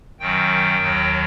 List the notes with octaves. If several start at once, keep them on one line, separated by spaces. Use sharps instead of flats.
F#2 D#3 F#3 G5
D#2 D#3 F#3